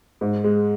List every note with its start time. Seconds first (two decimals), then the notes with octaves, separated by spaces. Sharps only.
0.21 G#2
0.44 G#3